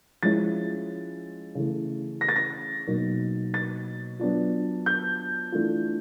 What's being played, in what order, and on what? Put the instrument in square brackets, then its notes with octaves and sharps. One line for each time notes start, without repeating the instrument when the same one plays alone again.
[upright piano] F3 G#3 C#4 E4 A6
C#3 E3 A3
A#6
A6
A#6
B2 F#3 A#3 D#4
A6
F#3 B3 D4 F4
G6
E3 A3 D4 F4